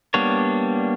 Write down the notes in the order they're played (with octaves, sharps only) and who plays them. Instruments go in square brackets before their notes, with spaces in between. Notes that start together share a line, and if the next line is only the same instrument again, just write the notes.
[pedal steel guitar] G3 A#3 B3 D4 C#5